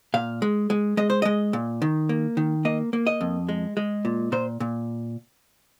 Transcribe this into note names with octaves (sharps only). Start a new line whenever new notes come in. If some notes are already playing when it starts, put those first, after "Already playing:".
A#2 F5
G#3
G#3
G#3 D#5
C5
G#3 D#5
A#2
D#3
A#3
D#3
A#3 D#5
A#3
D#5
F2
G#3
G#3
A#2
A#2 C5
A#2